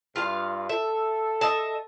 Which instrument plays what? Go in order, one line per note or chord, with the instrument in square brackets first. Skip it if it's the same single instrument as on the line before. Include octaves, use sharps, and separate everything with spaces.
[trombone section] G2 [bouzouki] F4 F5
[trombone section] A4 [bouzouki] E5
[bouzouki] D#5 E5 A5